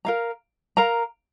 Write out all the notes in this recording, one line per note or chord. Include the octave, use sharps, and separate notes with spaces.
A#4 F5 A#5
A#4 F5 A#5